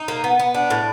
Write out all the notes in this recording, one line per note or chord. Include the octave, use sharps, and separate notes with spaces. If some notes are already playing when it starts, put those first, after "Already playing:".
Already playing: D#4
A#3
B3
B3
D4
A2